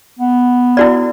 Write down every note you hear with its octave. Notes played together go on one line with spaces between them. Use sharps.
B3
E4 F#4 D5